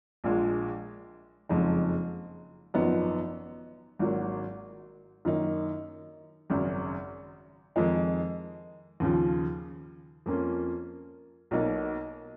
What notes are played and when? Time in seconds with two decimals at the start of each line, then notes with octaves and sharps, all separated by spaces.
0.24 A#1 A#2 F3 G#3
1.49 F#1 F2 F3 G#3 D#4
2.74 G#1 F#2 F3 B3 D#4
3.99 G#1 G#2 F#3 A#3
5.25 F#2 D#3 A#3 D#4
6.50 G#1 F#2 C#3
7.76 F2 D#3 G#3 D#4
9.00 D#2 C#3 F3
10.26 F2 F3 A#3 C#4 F4
11.51 B1 B2 A#3 D#4